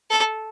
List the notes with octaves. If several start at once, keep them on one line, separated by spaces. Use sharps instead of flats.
A4